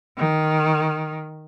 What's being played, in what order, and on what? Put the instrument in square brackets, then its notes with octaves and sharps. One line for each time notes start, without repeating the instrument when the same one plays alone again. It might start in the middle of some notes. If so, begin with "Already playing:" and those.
[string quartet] D#3